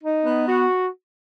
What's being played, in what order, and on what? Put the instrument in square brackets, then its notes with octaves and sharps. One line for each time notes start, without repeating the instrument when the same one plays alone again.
[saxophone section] D#4
B3
F#4